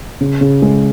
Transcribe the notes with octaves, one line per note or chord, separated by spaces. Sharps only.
C#3
C#3
G#3